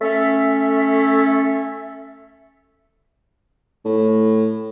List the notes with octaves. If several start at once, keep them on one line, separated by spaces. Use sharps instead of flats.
A3 C#4 A4 E5
A2